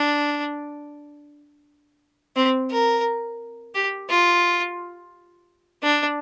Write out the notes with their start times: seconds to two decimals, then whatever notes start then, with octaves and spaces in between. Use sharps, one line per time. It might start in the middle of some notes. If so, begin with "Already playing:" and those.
Already playing: D4
2.36 C4
2.71 A#4
3.75 G4
4.09 F4
5.83 D4